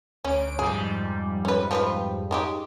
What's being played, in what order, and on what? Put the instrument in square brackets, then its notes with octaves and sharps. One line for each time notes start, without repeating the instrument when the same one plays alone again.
[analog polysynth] D2 D7 [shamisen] C#4
[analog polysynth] F2 G#2 G3 [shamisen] G#4
[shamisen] C#4 B4
F3 G#4 B4
D#3 G#3 G4